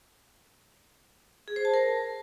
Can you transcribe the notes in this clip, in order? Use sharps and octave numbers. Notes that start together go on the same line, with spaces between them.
G#4
C5
A5
A#4